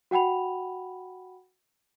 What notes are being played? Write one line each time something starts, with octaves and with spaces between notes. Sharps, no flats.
F#4 F#5 G5 B5 F7